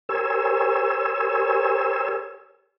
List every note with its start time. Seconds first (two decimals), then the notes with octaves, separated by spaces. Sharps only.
0.09 G4 A#4 C5 C#5 G#5 E6